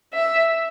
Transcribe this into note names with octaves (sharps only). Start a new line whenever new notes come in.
E5